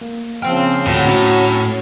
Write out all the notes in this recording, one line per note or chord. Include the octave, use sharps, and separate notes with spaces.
A#3
C#3 F3 C4 C5 G5 E6 F6
D2 A2 F#3
C#4 F#4